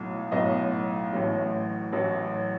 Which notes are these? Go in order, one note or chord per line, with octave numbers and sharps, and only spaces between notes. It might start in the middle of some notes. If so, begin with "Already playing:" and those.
Already playing: B1 A2 F#3
B1 A2 F#3 D#5
A1 A2 F#3
A1 A2 F#3